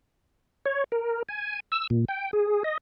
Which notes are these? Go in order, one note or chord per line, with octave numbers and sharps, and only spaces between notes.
C#5
A#4
G#5
E6
A#2
G5
G#4
D#5